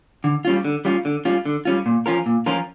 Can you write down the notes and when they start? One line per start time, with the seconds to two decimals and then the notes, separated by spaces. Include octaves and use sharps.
0.24 D3
0.45 G3 C#4 F4
0.65 D3
0.85 G3 C#4 F4
1.05 D3
1.25 G3 C#4 F4
1.45 D3
1.65 G3 C#4 F4
1.86 A#2
2.06 F3 C#4 F4 A#4
2.26 A#2
2.46 F3 C#4 F4 A#4